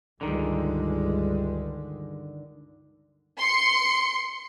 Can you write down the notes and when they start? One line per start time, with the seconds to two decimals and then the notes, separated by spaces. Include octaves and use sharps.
0.21 C#2 G2 D3 D#3 G3 G#3
3.38 C6 C#7